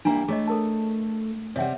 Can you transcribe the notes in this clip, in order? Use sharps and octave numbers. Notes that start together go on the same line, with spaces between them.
G3 A#3 D4 E4 A#5
A3 G#4 C#5 D#5
A4 A#4 A5
C3 G3 C#5 E5 F#5